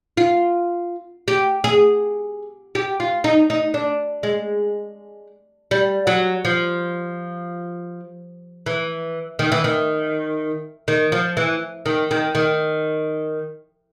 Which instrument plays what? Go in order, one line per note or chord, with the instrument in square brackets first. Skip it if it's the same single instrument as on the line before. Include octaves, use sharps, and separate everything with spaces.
[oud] F4
G4
G#4
G4
F4
D#4
D#4
D4
G#3
G3
F#3
F3
E3
D#3
E3
D#3
D#3
F3
E3
D#3
D#3
D#3